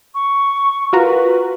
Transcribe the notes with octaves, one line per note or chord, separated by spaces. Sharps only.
C#6
F4 F#4 A#4 B4